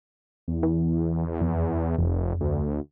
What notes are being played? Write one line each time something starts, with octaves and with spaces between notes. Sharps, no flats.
E2
E3
F2
F1 F2
D2